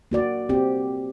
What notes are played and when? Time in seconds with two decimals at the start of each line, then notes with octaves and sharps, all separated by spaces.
0.11 A#3 F#4 D5
0.49 C4 G4